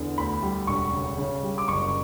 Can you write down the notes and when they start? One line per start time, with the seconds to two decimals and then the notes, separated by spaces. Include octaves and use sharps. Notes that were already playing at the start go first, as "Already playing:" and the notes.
Already playing: E2 D3
0.18 D2 B5
0.43 G3
0.67 E1 C#6
0.93 C#3
1.18 C#3
1.43 G3
1.58 D6
1.68 F#1 C#6